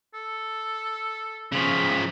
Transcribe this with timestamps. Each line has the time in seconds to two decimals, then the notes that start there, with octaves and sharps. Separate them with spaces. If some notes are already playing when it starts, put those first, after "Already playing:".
0.14 A4
1.52 C#3 F3 B5